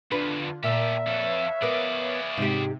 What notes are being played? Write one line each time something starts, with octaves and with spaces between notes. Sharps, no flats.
E2 D3 F3 D4 F4 B4
A#2 G4 A4 A#4 E5
F2 A4 B4 C#5 F5
B3 G#4 A#4 D5
G#2 C3 G4